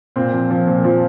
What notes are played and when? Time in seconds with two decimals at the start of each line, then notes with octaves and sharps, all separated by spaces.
0.16 A#2 C4
0.33 F3
0.50 F3
0.67 A#2
0.84 F3